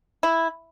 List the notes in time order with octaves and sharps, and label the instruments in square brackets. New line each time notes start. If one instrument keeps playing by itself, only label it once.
[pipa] E4